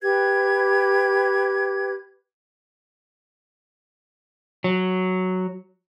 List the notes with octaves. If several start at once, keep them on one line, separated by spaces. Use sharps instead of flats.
G4 B4 G#6
F#3